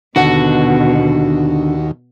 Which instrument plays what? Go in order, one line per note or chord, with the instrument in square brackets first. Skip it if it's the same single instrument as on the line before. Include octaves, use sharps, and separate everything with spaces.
[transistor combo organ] D#2 [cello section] B2 [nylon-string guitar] D3 F#5 [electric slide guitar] F#4